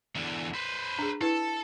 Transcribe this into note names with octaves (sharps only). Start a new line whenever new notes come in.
E2 D3
B4 C5
D4 G#4
E4 A4 B4